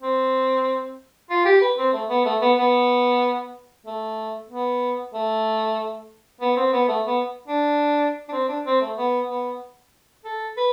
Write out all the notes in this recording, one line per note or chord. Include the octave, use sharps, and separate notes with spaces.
C4
F4
G4
B4
C4
A3
B3
A3
B3
B3
A3
B3
A3
B3
C4
B3
A3
B3
D4
D4
C4
D4
C4
A3
B3
B3
A4
B4